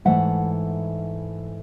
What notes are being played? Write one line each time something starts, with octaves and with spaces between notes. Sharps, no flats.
G#2 E3 A3 E5 F#5